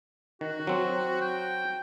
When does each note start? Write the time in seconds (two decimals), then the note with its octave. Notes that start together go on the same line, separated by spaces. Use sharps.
0.41 D#3 F#4
0.67 F#3 C4
1.21 G5